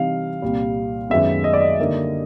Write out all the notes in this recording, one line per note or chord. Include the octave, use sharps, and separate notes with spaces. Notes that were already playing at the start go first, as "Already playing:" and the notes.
Already playing: C3 E3 G3 C4 D#4 F5
C2 A#2 G3
F#2 D#3 G#3 B3 E5
D#5
D5
D#5
D3 G3 A#3 D#4